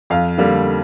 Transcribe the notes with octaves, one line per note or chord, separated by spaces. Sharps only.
F2 F5
D3 G3 A#3